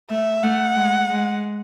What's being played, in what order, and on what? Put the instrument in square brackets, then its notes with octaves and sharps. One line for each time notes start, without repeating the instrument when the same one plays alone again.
[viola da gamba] A3 [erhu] E5
[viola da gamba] A3 [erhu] F#5
[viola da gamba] G#3
G#3